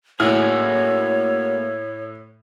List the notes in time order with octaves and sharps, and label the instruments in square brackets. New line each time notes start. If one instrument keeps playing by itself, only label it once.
[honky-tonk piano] A2 E4 F6 [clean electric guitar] A#3 F#4 G#4 [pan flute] C#5